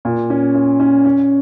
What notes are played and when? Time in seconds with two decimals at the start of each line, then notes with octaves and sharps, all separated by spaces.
0.05 A#2
0.30 C#4
0.55 C#4
0.80 C#4
1.05 C#4